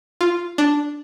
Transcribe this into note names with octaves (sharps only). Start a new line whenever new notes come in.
F4
D4